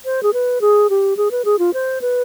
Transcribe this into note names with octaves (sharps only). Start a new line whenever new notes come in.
C5
G#4
B4
G#4
G4
G#4
B4
G#4
F4
C5
B4